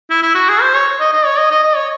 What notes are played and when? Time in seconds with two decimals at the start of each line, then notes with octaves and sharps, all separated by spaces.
0.10 E4
0.23 E4
0.35 F#4
0.49 G#4
0.62 C5
0.75 C#5
1.00 D#5
1.13 D#5
1.26 C#5
1.39 D#5
1.51 D#5
1.64 D#5
1.76 C#5